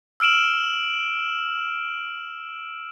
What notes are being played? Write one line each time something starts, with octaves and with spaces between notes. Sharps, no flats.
E6 F6 D7 E7 F#7